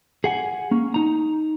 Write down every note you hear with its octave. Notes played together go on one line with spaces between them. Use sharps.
G#4 F#5 G#5
A#3 C#4
D#4 A#5